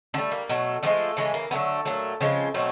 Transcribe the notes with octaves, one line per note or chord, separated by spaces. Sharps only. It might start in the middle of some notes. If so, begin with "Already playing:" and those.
D3 G3 A3
A#3
B2 F#3 A3
D3 F3 G#3 A3
C#3 E3 G#3
A#3
D3 F#3 A3 B3
A#2 F#3 A3
C#3 F3 G#3 C4
B2 F#3 A3 C4